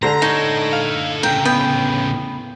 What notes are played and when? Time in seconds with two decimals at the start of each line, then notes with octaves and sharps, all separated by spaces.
0.03 D3 C5 A#5 A#6
0.22 D#4 A4 C#5
0.73 F5
1.23 A2 C#3 G5 A#5
1.45 B3 G5